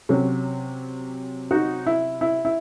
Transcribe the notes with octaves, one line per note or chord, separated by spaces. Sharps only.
C3 F#3 C#4
D#4 F#4
E4
E4
E4